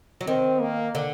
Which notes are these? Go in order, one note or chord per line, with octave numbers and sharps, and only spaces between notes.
F#3
D#3 C4
A#3
D3